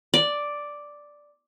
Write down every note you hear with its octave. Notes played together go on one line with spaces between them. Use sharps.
D5